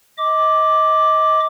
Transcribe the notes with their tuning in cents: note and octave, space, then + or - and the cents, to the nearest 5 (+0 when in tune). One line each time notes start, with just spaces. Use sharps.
D#5 +25 D6 +0